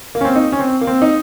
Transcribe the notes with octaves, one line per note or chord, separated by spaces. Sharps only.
A#3
C#4
C4
D#4
C#4
C4
A#3
C4
D#4